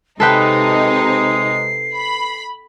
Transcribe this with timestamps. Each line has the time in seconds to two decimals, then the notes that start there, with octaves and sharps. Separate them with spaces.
0.20 C3 G#3 D#4 A4 B4 G5 C7
1.93 B5